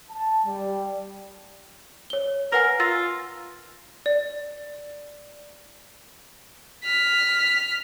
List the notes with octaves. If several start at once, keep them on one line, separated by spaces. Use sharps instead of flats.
A5
G3
C#5 G7
A#4 B4 F#5 G#5
F4 E6 A6 A#6
D5
F6 B6